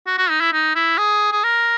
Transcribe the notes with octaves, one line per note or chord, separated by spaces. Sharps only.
F#4
F#4
D#4
E4
D#4
E4
G#4
G#4
A#4